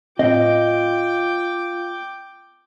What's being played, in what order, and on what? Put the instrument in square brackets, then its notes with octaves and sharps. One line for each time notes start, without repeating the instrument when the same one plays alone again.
[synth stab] A2 C4 [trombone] F4 [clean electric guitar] D#5 [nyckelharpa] G5 D6